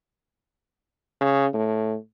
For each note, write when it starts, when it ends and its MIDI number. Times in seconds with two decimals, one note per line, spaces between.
1.21 1.46 49
1.54 1.96 45